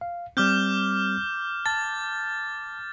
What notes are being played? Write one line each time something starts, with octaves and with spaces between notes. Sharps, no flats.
F5
G3 C4 D6 F6 G6
A5 A6